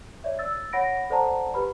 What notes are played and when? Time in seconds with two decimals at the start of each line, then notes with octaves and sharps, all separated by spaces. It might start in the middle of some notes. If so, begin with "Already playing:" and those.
0.24 C#5 D5 E5
0.39 E6 A6
0.73 C#5 F#5 B5 A#6 D7
1.10 A4 C5 D5 F#5 A5 A#5
1.54 G4 B4 B5